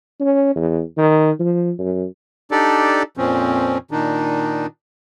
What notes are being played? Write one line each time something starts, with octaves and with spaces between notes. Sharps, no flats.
C#4
E2
D#3
F3
F#2
D4 D#4 G4 A4 D5
F2 A#2 F3 C4 C#4
A#2 D#3 D4 D#4